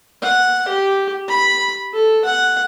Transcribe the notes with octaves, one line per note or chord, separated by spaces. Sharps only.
F#5
G4
B5
A4
F#5